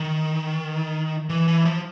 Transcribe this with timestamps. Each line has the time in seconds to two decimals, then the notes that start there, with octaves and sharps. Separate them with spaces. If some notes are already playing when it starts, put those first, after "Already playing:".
Already playing: D#3
1.30 E3
1.48 E3
1.65 F3